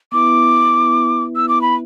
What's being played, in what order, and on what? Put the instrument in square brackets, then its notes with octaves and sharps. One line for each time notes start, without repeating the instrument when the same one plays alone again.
[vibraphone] B3 E4 B4 E5 [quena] D6
[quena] E6
D6
B5